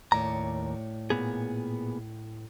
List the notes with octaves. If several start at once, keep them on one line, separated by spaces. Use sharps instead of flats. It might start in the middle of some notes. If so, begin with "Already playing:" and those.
D#2 A2 C#5 D5 A#5
A#2 B3 G#4